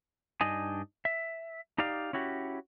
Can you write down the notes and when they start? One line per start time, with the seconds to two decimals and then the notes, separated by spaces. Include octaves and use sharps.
0.41 G2 D4 D#4 D#5 G#5
1.05 E5
1.78 D#4 G4 D5 F5
2.13 C#4 E4 F#4 G4